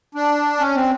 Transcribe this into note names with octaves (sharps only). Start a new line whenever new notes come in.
D4
C#4
C4